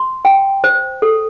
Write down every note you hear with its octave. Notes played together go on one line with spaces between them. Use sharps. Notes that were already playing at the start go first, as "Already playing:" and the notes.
Already playing: C6
G5
C5
A4